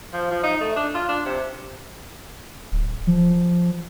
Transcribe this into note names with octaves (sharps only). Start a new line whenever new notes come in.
F3
F3
D#4
A3
D4
F4
D4
C3
D1
F3